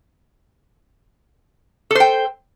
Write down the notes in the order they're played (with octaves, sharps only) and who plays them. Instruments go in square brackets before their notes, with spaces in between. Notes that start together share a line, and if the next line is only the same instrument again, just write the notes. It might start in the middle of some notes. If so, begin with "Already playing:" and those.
[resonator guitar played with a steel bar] A4
C5
G5